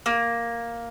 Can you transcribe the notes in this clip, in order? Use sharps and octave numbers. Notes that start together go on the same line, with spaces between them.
A#3